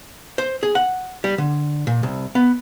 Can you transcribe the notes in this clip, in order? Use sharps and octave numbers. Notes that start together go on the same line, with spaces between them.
C5
G#4
F#5
G3
D3
A#2
C2
B3